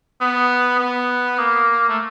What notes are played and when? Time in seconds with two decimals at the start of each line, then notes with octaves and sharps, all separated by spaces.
0.21 B3
0.80 B3
1.38 A#3
1.89 A3